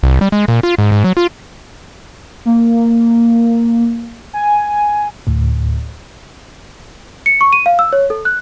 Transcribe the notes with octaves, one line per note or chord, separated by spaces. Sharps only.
C2
G3
G#3
A#2
F4
G#2
G#2
F#3
F4
A#3
G#5
D2 A2
C#7
C#6
D#7
F5
E6
C#5
A4
F#6